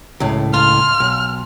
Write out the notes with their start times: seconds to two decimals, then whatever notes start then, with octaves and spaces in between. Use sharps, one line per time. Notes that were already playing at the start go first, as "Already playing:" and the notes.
0.20 C#2 A2
0.54 F4 F6
1.00 B1